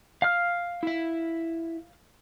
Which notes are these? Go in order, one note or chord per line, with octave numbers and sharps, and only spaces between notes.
F5 F6
E4 E5